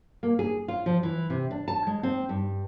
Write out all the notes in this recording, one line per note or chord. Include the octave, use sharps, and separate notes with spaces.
A#3
G#4
F4
F3
E3
C3
D4
A5
G#3
C4
G2